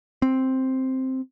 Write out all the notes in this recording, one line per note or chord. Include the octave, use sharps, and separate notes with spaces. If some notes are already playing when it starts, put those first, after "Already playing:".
C4